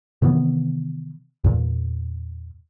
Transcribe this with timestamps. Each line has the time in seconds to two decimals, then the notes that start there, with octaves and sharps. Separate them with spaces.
0.22 C3 D#3 E3 B3
1.44 E2 A#2